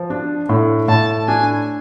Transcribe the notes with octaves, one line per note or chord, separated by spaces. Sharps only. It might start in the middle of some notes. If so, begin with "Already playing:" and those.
Already playing: F3
D4
A2
A2 A5
D4 G#5